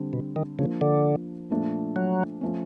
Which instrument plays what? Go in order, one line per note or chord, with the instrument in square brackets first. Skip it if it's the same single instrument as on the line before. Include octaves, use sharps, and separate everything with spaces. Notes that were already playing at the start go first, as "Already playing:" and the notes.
Already playing: [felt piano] D3 G3 C4
[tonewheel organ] B2
D#3
[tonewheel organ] C#3 [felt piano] F3 A#3 D4
[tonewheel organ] D3
[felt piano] A#2 F3 A3 D4
[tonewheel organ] F#3
[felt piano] F3 A3 C#4